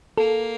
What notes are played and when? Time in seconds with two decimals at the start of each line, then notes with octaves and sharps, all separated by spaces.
0.18 A#3 A4